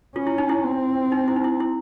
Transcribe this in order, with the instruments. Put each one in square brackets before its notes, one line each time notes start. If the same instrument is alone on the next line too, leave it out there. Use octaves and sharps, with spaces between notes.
[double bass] C#4 [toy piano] F4
[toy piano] E4
D#4
E4
[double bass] C4
[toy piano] D#4
E4
D#4
E4
E4